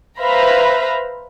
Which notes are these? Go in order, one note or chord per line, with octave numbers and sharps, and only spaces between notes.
B4 C5 E5 F5 A#5 B5